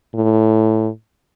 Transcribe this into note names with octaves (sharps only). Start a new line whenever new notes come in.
A2